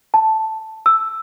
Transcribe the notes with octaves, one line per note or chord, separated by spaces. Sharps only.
A5
E6